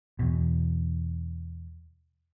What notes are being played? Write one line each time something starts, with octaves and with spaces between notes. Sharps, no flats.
E2 B2